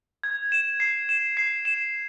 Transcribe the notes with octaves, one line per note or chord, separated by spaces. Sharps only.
G#6
E7
C7
E7
C7
E7